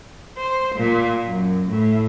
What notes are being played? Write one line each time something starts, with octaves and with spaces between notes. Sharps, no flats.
C5
A#2
F#2
A2